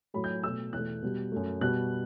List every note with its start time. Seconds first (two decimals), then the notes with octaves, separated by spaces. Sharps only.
0.14 A2 F#3 A3 B5
0.24 G6
0.44 B2 A3 E6
0.73 E2 B2 A3 F#6
1.02 B2 G3
1.32 F#2 F#3 A3
1.61 B2 G3 F#6